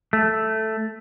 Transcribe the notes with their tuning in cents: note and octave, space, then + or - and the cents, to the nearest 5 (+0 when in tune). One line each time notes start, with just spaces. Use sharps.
A3 +0